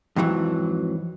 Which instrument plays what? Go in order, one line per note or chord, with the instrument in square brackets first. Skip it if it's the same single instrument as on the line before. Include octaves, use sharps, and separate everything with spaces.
[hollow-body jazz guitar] F2 G#2 E3 F#3